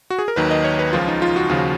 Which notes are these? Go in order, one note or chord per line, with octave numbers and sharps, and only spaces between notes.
F#4
G#4
A#4
D#2 D#3 F#3 B4
D#5
C#5
B4
C#2 C#3 F3 F4
D#4
F4
F#4
D#2 C#3 F3 F4
F#4